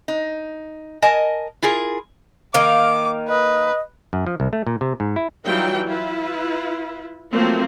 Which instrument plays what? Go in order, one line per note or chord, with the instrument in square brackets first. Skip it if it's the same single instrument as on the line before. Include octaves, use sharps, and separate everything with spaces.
[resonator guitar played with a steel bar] D#4
A#4 D#5 G#5 A5
E4 F4 G#4 A#4
[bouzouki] D#3 A#3 F5 [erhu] D6
[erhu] B4 [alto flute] D#5
[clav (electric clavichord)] F#2
F3
C2
A3
A#2
C3
G#2
E4
[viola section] E3 F#3 G3 D#4 F4 G5
E4 F4 B4
F3 F#3 A3 A#3 C4